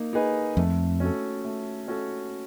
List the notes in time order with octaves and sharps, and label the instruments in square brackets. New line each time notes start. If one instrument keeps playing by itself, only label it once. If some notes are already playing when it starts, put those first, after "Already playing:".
Already playing: [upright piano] A#3 D#4
D#4 G#4 B4
[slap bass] F2 [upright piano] A3
[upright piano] C#4 F#4 A4
A3
C#4 F#4 A4